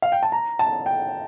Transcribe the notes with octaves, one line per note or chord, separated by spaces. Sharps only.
F5
G5
A5
A#5
A5
G5